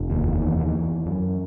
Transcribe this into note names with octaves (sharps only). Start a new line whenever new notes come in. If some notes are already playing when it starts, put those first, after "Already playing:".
Already playing: F1
D#2
E2
E2
F#2